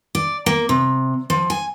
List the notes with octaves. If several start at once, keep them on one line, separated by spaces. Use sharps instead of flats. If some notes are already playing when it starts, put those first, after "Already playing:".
D5
A#3
C3
F3
G#5